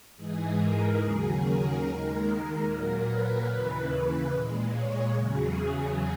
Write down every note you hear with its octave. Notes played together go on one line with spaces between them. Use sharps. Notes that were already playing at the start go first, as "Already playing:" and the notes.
G#2 E3 G#3 G#4
A#4
D#2 C#3 F#3 G#4
A#4
D#2 D#3 G#3
A#2 A#4
F#3
B4
D#2 C#3 E3 B4
A#2 G#3
C#5
E2 C#3 F#3 G#4